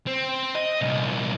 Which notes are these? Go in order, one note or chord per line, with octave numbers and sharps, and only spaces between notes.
C4
D#5
C2 A#2